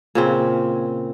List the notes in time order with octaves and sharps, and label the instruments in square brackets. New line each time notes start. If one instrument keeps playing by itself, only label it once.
[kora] A#2 C#3 C4